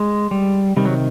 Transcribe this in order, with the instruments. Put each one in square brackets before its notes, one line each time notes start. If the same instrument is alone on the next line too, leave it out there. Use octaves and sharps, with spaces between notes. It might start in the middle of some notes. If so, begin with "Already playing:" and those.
Already playing: [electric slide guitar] G#3
G3
C3 D#3 G3
F#3